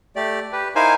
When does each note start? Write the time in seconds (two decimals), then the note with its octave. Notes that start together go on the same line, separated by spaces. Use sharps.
0.16 A3 G4 D5
0.53 G4 B4
0.75 D#4 E4 A#4 C5 F5 G#5